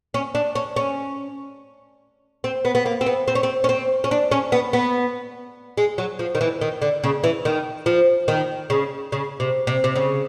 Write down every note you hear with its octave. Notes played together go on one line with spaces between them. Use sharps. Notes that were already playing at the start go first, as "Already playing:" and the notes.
C#4
D4
C#4
C#4
C4
B3
B3
A#3
C4
B3
C4
C#4
C4
C#4
C4
C#4
D4
C#4
B3
B3
G#3
F#3
F3
D#3
E3
D#3
D3
C#3
E3
D#3
F3
D#3
C#3
C#3
C3
C3
C3
C#3